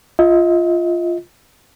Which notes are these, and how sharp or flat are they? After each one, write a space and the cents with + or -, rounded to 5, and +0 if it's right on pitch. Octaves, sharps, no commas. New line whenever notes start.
F4 -5 D#5 +35